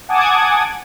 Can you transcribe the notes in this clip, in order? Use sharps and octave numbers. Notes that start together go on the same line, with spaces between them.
F#5 G#5 A5 D6 D#6 G#6